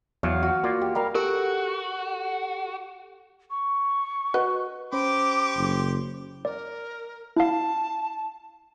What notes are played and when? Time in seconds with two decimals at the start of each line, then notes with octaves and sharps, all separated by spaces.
0.23 E2 F#3 F5
0.43 F#4
0.63 A#3 F4 D5
0.81 G4
0.95 G3 A#4 F5
1.15 F#4 G4 A4 A#4 C#6
3.51 C#6
4.34 F#4 B4 D#5
4.93 C#4 G4 C5 B5 C6 D6
5.57 F#1
6.45 A#4 D5
7.36 E4 F5 A5